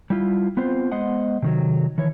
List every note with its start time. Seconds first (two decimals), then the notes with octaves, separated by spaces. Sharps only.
0.10 G3 E4 F4
0.57 B3 C4 F4 C5
0.91 G#3 B3 C5 D#5 F#5
1.42 C3 D#3 F#3
1.98 D#3 E3 C#5